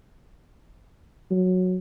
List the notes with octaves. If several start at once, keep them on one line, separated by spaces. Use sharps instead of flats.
F#3